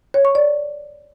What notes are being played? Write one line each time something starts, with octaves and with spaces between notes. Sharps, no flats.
C#5
C#6
D5